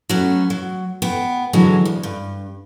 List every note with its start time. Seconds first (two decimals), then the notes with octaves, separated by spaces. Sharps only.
0.09 F#3 A3 B3 C#4
0.50 F#3
1.02 B3 G5
1.53 D3 E3 F#3 G#3
1.85 D2
2.03 G2